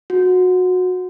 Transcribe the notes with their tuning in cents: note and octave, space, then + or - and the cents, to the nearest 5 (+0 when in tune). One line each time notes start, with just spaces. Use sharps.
F#4 -20